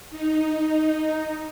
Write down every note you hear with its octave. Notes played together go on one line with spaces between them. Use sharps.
D#4